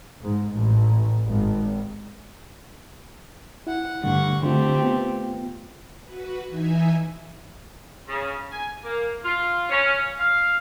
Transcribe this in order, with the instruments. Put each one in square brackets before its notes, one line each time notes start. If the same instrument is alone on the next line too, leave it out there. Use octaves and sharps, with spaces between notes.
[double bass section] G#2
A1
G#1
[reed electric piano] E4 [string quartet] F#5
[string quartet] G2 F#5 C#6 [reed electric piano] D3 A3
[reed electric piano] D3 F4 [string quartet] A3 C4 G4
[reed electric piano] B3 F4
[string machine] F#4 B4
E3 D#4 E5 G#5
[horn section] C#3
G#5
A#3
F4
C#4
F5